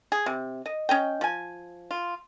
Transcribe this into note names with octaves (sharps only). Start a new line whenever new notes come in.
G#4
C3
D#5
C#4 D#5 G5
F3 G#5
F4